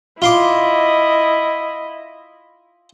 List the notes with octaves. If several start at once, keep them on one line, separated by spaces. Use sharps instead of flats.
E4 F4 D#5 C6 D6